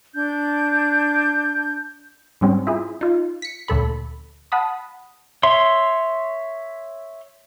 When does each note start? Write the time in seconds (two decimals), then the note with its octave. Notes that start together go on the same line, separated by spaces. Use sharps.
0.14 D4 G6
2.41 G#2 G3 C4 C#4
2.67 E4 F4 G#4
3.01 D#4 F4
3.42 B6 C#7
3.68 D2 A#2 A4 B5
4.52 F#5 A5 B5 D#6
5.43 C#5 E5 C6